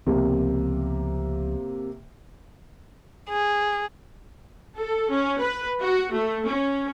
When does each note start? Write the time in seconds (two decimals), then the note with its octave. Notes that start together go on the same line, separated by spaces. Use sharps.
0.07 C#2 C3 F3 A#3 B3
3.30 G#4
4.78 A4
5.12 C#4
5.41 B4
5.81 F#4
6.13 A3
6.47 C#4